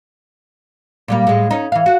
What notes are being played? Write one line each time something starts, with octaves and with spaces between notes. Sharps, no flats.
A#2 G3 A#3
A2 G#3
C#4 D#4
E3 F5
F#4